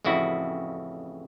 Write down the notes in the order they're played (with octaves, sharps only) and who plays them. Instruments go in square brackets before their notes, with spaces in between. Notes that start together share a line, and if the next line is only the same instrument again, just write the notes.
[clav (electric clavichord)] A1 F2 C#3 E4 F#4